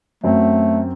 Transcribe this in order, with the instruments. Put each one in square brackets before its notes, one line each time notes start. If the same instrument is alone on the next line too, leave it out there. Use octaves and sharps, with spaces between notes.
[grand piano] F#2 F#3 C4 [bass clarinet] A3